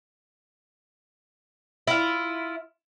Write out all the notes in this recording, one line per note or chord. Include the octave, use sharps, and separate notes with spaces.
E4 F4